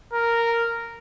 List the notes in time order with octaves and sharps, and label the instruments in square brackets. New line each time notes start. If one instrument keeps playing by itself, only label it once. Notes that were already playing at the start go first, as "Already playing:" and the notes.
[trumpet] A#4